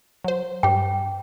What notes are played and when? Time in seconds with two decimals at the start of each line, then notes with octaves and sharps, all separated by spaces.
0.24 F#3 C5
0.63 G2 G4 G5